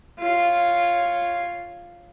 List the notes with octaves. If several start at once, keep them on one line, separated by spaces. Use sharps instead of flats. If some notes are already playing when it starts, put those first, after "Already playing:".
F4 C#5